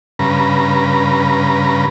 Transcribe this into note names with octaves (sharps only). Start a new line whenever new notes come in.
G2 C#3 B4 A#5